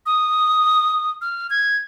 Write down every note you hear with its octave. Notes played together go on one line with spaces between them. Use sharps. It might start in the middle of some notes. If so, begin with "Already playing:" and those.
D#6
F6
G#6